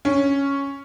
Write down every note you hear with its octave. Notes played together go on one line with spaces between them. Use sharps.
C#4